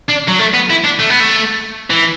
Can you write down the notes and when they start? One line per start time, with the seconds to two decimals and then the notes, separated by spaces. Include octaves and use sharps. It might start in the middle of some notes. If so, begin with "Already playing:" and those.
0.09 D4
0.28 F#3
0.39 A3
0.54 B3
0.70 E4
0.84 D4
0.99 A3
1.10 B3
1.20 A3
1.90 E3